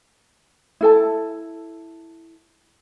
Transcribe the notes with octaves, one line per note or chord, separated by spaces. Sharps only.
E4 A4 A5